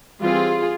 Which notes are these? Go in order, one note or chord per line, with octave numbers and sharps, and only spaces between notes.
E3 G3 C4 F4 G#4